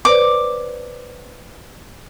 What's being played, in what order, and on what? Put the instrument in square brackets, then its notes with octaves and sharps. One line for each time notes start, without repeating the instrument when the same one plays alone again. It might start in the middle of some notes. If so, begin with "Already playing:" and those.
[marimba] B4 C5 D5 [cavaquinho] D6